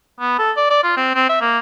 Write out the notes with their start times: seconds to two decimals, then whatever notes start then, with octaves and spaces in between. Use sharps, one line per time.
0.20 B3
0.39 A4
0.57 D5
0.70 D5
0.83 F4
0.97 C4
1.15 C4
1.29 E5
1.41 A#3